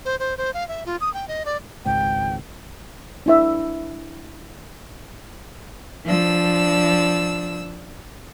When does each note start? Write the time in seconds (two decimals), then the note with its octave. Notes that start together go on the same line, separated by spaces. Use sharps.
0.05 C5
0.19 C5
0.38 C5
0.54 F5
0.68 E5
0.86 F4
1.01 D#6
1.14 G5
1.28 D#5
1.45 D5
1.85 G#1 C#2 G#2 G5
3.26 D4 E4 E5
6.05 F3 D4 E6